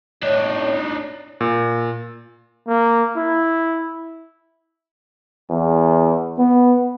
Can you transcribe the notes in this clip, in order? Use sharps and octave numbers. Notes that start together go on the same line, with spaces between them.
A2 D4 D#4 C#5
A#2
A#3
E4
E2
B3